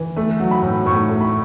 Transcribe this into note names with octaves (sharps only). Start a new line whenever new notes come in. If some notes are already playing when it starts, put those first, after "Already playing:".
Already playing: E3
A3
F#3
B5
A2
A2 C#6
A3
B5